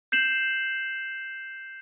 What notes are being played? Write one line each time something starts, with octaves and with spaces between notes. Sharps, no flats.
G6 C7 E7 F#7